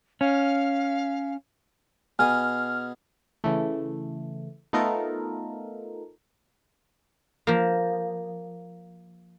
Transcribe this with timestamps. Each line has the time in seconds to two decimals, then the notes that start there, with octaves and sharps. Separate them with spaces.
0.21 C#4 F5
2.19 B2 G#4 G#5 F6
3.44 C#3 E3 A3
4.73 A3 B3 D#4 F4 A4 A#4
7.47 F3 A#3